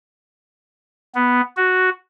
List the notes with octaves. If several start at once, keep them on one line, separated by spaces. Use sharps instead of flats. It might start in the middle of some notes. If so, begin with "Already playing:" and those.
B3
F#4